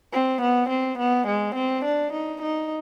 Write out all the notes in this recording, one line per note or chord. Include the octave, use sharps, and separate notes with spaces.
C4
B3
C4
B3
G#3
C4
D4
D#4
D#4